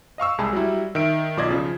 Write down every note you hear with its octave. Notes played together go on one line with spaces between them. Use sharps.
D#5 F5 C#6 E6
C2 G#3 G#4 A5 B5
F#3 G3 E4
D#3 E5 D7
B1 F4 D5 D#5 G#6
C#3 F3